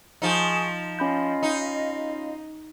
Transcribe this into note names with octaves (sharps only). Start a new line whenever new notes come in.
F3 D#4 G#4 C#6
C#4 F4 D#5 F5 B5 G6
D#4